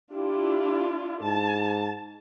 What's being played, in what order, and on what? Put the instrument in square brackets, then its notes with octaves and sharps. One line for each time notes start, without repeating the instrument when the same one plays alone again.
[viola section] D4 E4 F4 [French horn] G4
[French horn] G#2 [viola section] A5